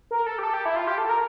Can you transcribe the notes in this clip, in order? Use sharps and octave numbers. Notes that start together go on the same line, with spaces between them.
A#4
A4
G4
A4
G4
E4
F4
G4
A4
A#4